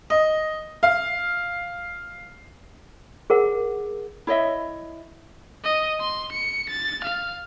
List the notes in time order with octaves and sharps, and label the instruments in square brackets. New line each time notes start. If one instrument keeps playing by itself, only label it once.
[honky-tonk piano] D#5
F5
[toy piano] G#4 A#4 F#5
[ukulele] E4 C#5 D#5 E5
[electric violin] D#5
C6
C#7
A6
F5